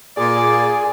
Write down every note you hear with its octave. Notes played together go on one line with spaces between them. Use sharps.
A#2 G#4 D5